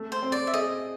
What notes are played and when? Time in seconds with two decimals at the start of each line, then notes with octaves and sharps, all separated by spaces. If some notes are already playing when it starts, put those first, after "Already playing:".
Already playing: A3
0.12 C5
0.22 C4
0.32 D5
0.47 E5
0.54 G#4 D#5